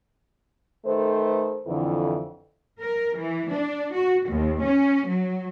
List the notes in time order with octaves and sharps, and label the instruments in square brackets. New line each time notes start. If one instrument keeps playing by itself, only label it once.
[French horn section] D#3 A3 A4 B4 C5
F2 D3 E3
[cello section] A#4
E3
D4
F#4
D#2
C#4
F#3